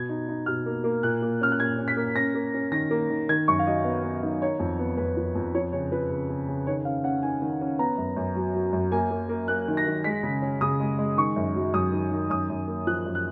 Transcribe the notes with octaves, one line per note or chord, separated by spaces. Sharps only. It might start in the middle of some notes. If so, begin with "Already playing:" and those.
Already playing: B2 G#6
D#4
D#4
B2 F6
A#3
A#3
A#2 F#6
A#3
C#4 F6
F#6
A#2 G#6
C#4
B6
A#3
C#4 A#6
A#3
C#4
D#3 A#6
A#3
D#3
D#3 G#6
F#2 C#6
F5
F#3 D#5
B3
B3
D#3
D#4 C#5
F2
B3
F2 B4
F3
F2
F3 C#5
C#3 C#5
F3 B4
C#3
C#3
C#3
D#3 C#5
C#4 F5
C#4 F#5
D#3 G#5
D#3
C#4
B3 A#5
F#2
F#2
F#3
F#3
F#2
A#3 G#5
A#3
A#3
A#3 F#6
D#3
A#6
D#3
G#3 B6
C#3
C#4
C#3 D#6
G#3
G#3
D#3 C#6
F#2
F#3
F#2 D#6
D#3
D#3
F#2 D#6
F#2
A#3
F3 F#6
F#2
F#6